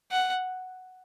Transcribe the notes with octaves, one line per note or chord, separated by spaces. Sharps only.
F#5